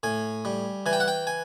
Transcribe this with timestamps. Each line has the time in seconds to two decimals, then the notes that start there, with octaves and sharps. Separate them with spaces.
0.03 A2 G#5
0.45 G3
0.86 E3 G#5
0.93 G5
1.00 F#5
1.08 G5
1.27 G#5